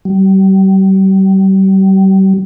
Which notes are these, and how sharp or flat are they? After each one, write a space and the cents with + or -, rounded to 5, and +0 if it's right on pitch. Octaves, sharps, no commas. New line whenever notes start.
G3 -35